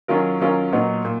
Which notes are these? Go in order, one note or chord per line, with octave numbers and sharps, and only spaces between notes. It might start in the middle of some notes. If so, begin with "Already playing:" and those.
D#3 F#3 C#4 F4 A#4
D#3 F#3 C#4 F4 A#4
A#2 F#3 B3 D#4
A#2